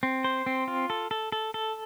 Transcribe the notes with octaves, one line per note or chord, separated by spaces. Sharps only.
C4
C5
C4
F4
A4
A4
A4
A4